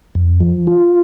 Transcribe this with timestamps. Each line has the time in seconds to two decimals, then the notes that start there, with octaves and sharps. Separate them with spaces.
0.15 F2
0.40 F3
0.67 F4